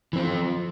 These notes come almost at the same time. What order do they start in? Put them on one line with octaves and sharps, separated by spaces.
E3 C4 F3